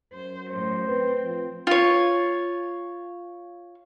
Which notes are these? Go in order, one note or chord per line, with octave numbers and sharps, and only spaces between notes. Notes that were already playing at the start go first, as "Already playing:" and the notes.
F#2 C5
A2 F#3 C5
C4 B4
F3
F4 C#5